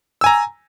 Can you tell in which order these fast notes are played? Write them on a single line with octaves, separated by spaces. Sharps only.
E6 G#5 A#5